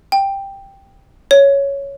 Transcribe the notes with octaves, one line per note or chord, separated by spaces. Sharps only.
G5
C#5